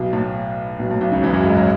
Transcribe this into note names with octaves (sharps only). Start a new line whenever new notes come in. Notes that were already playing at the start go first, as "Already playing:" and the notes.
Already playing: B1 B2
A2
B1 B2
A2
B1 B2
C#2 C#3
E2 E3
F#2 F#3
G#2 G#3
F#3